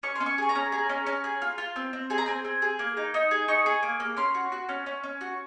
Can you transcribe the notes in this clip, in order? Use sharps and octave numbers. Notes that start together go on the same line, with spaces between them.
C#4 C#6
C6
C#4
C#6
G#4 G#5
A#5
C#4
G#4 A#5
C#4
C#4
G#4
F4
F4
C4
C4
G#4 G#5
A#5
C4 G#5
C4
G#4
A#3
D#4
D#4
G#4
D#4 C#6
G#4
A#3
A#3
C#4 C6
F#4
F#4
C#4
C#4
C#4
F#4